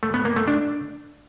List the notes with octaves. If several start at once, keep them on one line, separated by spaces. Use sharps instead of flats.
A3
B3
A#3
A3
D4